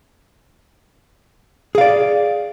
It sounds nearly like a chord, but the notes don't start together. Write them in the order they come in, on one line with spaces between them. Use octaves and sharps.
G#4 F5 D5